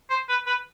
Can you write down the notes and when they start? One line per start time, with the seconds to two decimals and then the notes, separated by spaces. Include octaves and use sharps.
0.10 C5
0.29 B4
0.47 B4